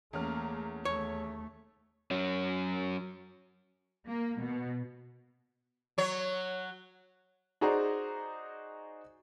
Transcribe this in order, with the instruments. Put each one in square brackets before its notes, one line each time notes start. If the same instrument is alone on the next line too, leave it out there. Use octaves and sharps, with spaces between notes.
[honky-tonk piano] E2 C#4 F6 [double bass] A3 A#3
[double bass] D#2 A3 [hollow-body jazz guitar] C#5
[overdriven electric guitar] F#3 C#4
[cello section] A#3
B2
[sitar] F#3 C#5
[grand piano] D#4 F#4 G#4 C5 D5 A#5